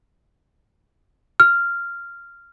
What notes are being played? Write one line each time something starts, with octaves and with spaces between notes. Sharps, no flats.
F6